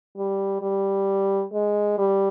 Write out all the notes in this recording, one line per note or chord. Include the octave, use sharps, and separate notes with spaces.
G3
G3
G#3
G3